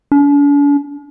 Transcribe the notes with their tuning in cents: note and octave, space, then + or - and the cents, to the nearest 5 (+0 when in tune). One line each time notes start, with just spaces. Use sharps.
D4 -45